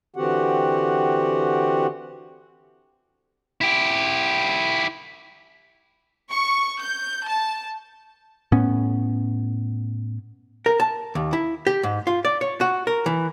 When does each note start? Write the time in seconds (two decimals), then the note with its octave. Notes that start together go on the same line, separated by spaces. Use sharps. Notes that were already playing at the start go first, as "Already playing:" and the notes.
0.16 D3 E3 C4 F#4 G4 F#5
3.61 E4 G4
6.29 C#6
6.79 G6
7.25 A5
8.52 A2 B3 C#4
10.66 A#4
10.80 A5
11.15 D#2
11.33 E4
11.67 G4
11.83 G#2
12.07 F4
12.25 D5
12.41 C#5
12.61 F#4
12.87 A#4
13.06 E3